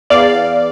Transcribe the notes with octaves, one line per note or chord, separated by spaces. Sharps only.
E2 D5 F5